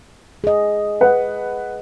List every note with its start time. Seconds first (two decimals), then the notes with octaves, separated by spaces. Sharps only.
0.44 G#4 D#5
1.01 B4 F#5